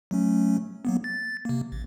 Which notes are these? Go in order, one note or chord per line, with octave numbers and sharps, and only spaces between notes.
F#3 A3 C#4
F#3 A#3 B3
A6
C3 A#3
A1